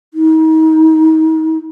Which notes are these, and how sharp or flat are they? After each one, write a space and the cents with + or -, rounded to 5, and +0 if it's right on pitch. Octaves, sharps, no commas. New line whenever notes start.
D#4 +35